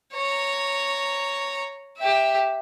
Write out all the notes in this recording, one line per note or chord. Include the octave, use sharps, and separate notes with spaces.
C#5 A#5
G4 E5